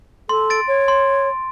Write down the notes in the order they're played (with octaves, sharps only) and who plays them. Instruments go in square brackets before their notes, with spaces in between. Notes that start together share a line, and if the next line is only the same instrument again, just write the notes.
[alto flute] A4 [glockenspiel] C6
[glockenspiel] A6 D7
[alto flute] C#5
[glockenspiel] C6